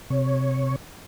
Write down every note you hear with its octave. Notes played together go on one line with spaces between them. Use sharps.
C3 C#5